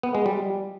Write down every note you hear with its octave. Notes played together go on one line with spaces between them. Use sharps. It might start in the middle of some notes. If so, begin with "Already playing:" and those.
B3
G#3
G3